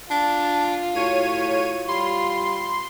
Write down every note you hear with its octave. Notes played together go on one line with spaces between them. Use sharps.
D4 F4 A5
A2 F#4 C#5 D#7
G3 F4 B5 C6